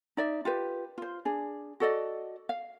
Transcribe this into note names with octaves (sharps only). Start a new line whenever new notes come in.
D#4 D5 E5
F4 G4 B4
F4 C5
D4 G#4
F#4 A4 D5 D#5
F5